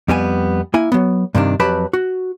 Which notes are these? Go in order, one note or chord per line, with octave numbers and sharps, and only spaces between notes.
F2 G3 B3 G#5
A#3 E4 G#5
F#3 B3
G2 C3 D#3 D4
F2 F#3 G4 B4 A5 B5
F#4